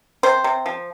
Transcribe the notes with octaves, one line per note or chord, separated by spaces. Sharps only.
C3 C5
C3
F3